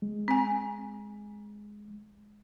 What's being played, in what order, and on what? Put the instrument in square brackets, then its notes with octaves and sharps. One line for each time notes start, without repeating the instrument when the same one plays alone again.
[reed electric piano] G#3
[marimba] C4 G#5